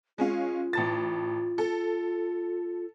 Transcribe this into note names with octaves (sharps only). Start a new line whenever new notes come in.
G#3 C#4 F4 F5
A1 A5 A6
A4